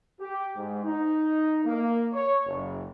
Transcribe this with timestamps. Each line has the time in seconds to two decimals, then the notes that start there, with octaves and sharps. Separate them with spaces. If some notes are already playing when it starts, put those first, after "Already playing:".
0.20 G4
0.55 G#2
0.84 D#4
1.65 A#3
2.13 C#5
2.47 F#1